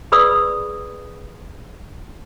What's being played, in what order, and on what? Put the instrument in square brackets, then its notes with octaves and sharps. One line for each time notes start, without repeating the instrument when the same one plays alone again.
[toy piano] G#4 B4 D5 B5 D#6 E6